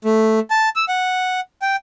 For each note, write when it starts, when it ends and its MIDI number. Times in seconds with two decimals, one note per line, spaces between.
0.05 0.40 57
0.50 0.69 81
0.76 0.85 88
0.89 1.40 78
1.62 1.76 79